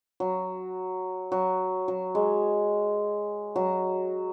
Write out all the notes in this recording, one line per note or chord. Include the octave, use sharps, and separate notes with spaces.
F#3
F#3
F#3
G#3
F#3